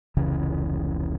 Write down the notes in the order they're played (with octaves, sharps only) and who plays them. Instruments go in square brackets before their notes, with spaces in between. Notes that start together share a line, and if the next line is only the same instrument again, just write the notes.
[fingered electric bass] F1 C#2 C#3 E3